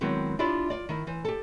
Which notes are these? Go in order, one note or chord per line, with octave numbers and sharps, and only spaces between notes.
D#3 F#3 G#3 B3 C4 E4
D4 E4 F4 G4 D5
F4 D5
D#3 E4
E3 C5
G4 A4